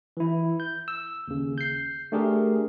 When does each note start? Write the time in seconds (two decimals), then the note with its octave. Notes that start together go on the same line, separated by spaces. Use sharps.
0.17 E3 E4
0.60 G6
0.88 E6
1.28 D#2 C#3
1.58 G6 C7
2.12 A3 D4 G4 G#4 A#4